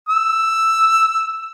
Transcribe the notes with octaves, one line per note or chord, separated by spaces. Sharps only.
E6